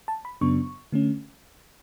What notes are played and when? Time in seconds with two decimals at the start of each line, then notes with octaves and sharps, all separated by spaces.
0.08 A5
0.25 B5
0.41 F#2 C#3 F#3 B3 D4 C#6
0.92 D3 A3 C#4